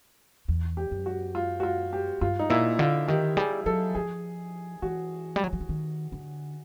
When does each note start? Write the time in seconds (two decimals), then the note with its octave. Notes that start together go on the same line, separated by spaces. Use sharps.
0.48 E2
0.77 G4
0.91 F#2
1.06 F#4
1.35 F4
1.60 F#4
1.63 F4
1.93 G4
2.21 G2 F4
2.39 D#4
2.50 A#2 E4
2.79 D3 F4
3.08 D#3 G4
3.37 G3 G#4
3.66 F#3 A4
3.95 F3 G#4
4.82 E3 F#4
5.36 G3
5.44 F#3
5.53 F3
5.61 E3
5.69 D#3
6.12 D3